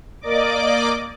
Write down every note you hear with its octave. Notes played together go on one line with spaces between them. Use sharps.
A#3 D5 D#5 D6